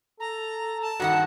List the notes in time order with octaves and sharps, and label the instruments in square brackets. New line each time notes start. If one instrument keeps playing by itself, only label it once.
[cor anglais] A4 [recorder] A#5
[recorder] A5
[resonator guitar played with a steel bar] G2 D#3 F#5 [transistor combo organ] F#4